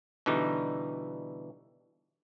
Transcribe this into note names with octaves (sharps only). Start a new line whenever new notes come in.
B2 D3 E3 G3 D#4